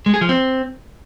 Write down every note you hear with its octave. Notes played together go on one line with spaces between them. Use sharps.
G#3
G#4
F3
C4